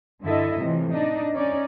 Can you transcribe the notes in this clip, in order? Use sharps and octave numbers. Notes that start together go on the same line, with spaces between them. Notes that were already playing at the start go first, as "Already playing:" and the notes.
G2 D3 E4 A4 D#5 E5
A2 C3 E3 F3
D4 D#4 D#5
C#4 D#4 D5